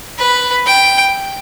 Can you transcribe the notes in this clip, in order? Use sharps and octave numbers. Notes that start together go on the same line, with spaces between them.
B4
G5